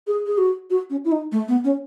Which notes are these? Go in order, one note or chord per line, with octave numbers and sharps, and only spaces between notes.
G#4
G#4
F#4
F#4
C#4
E4
D#4
A3
B3
C#4